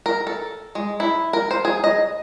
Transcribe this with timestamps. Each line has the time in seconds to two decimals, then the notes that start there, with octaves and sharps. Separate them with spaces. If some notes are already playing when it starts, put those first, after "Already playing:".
0.06 A#4
0.27 A4
0.75 G#3
1.00 E4
1.33 A#4
1.51 C5
1.65 G#4
1.84 D#5